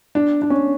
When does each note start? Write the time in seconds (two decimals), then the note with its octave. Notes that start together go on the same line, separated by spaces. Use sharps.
0.15 D4
0.42 D4
0.50 C#4